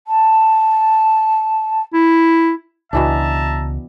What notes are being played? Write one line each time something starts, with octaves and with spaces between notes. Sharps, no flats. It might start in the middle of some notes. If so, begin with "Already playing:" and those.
A5
E4
C#2 B2 E3 D4 E5 A5 A#5